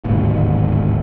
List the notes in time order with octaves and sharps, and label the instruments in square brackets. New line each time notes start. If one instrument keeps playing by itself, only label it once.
[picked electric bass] D1 G#1 D#2 B2